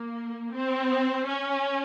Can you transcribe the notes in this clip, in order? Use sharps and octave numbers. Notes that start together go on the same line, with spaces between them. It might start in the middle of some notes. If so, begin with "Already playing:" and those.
Already playing: A#3
C4
C#4